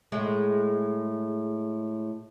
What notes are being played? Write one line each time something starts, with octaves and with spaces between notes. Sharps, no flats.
A2 G#3